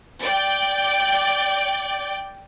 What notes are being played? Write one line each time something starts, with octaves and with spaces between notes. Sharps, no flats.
D5 G5